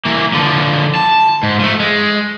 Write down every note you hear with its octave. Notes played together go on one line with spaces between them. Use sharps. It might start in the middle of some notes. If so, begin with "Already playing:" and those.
E3 A#3
D3 F3
A5
G#2
F3 A3
G#3